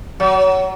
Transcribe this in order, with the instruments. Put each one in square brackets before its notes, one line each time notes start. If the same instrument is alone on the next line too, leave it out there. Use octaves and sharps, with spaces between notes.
[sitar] F#3